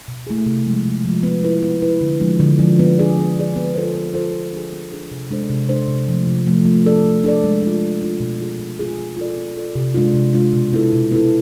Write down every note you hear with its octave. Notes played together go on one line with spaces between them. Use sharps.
B2
A3 E4 G#4
C3
F3 G#3
C3
F3 G#3
B3
E4 B4
B3
E4 B4
D3
F3 G#3 D4
D3
F3 G#3 D4
B3
D4 G#4 D5
B3
D4 G#4 D5
B3
F4 A4 C5
B3
F4 A4 C5
B3
D4 G#4
B3
D4 G#4
C3
G#3 D4 A4 C5
C3
G#3 D4 A4 C5
C3
F3 A3
C3
F3 A3
A3
D4 A4 D5
A3
D4 A4 D5
G#3
D4 F4
G#3
D4 F4
B2
B3 F4 G#4
B2
B3 F4 G#4
B3
F4 A4 D5
B3
F4 A4 D5
C3
G#3 D4 F4
C3
G#3 D4 F4
B2
B3 E4 A4
B2
B3 E4 A4